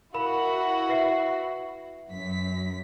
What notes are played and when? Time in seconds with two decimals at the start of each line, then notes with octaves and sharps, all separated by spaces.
0.14 E4 F#4 A#4 F5 B5
0.89 B4 E5 C7
2.09 F#2 B6